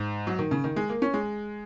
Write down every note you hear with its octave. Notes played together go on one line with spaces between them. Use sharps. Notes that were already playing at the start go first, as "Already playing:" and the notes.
Already playing: G#2
F#3
D#3
C#3
D#3
G#3
A#3
C#4
G#3